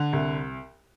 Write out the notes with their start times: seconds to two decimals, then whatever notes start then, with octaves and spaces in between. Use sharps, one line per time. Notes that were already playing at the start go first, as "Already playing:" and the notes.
Already playing: D3
0.13 C2